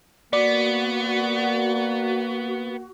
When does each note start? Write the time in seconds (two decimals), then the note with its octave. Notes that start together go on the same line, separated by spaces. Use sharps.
0.33 A#3 B3 F#4 D5